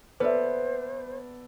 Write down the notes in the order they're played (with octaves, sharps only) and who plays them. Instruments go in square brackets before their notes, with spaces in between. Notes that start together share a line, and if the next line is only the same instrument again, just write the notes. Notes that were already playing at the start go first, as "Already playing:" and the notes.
[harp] B3 [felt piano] A4 D5 E5 [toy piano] B4 [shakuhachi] C5